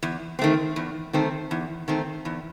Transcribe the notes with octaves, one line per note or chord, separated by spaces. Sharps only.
E2
D#3 A3 C4
E2
D#3 A3 C4
E2
D#3 A3 C4
E2